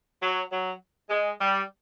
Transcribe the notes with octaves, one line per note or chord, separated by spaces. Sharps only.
F#3
F#3
G#3
G3